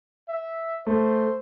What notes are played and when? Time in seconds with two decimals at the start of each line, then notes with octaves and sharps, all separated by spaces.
0.28 E5
0.87 A3 C5